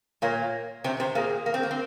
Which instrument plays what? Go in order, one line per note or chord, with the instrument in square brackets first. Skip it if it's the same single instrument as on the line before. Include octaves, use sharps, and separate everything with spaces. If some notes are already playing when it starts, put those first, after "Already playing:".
[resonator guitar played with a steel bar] A#2 A#3 [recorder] C#5
[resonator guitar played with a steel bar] C3 C4 [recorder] C5
[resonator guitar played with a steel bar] C3 C4 [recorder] C5
[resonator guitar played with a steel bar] A#2 A#3 [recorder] G#4
[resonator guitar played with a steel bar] A#3
C4
A#3
C4